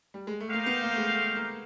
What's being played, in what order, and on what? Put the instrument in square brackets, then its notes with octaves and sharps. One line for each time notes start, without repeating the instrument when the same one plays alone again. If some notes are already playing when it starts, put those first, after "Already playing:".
[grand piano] G3
G#3
A3
[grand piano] A#3 [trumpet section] D#4 G4 C5 F5
[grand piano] B3
A#3
A3
G#3
A3
A#3